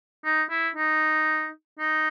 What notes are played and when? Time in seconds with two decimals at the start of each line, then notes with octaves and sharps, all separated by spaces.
0.24 D#4
0.50 E4
0.76 D#4
1.79 D#4